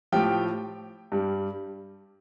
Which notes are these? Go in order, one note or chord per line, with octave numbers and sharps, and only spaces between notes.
A2 F3 G4 G5
G2 G3